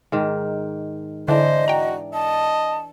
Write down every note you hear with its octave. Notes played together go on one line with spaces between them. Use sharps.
G#2 D#3
D3 E3 D4 C5 D#5
F#4 G5 A#5
D#5 A5